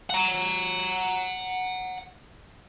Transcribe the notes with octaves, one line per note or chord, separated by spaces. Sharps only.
F#5 A#5